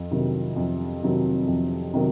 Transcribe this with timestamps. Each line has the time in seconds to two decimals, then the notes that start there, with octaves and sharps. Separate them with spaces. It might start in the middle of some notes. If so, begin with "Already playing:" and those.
Already playing: F2
0.11 C3 D#3 F#3
0.56 F2
1.03 C3 D#3 F#3
1.48 F2
1.94 C3 D#3 F#3